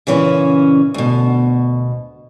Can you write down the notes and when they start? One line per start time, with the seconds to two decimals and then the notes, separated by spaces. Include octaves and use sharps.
0.07 A#2 C#3 E3 C#4
0.94 D2 B2